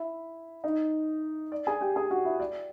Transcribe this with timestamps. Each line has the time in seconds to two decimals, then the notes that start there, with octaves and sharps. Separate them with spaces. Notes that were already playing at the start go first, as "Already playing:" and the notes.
Already playing: E4 E5
0.64 D#4 D#5
1.52 D5
1.67 G#4 G#5
1.81 G4 G5
1.96 G#4 G#5
2.10 F#4 F#5
2.25 E4 E5
2.40 D5